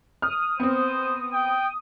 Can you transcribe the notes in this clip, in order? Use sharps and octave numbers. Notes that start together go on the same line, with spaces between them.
D#6 F6
B3 C4 C5
G5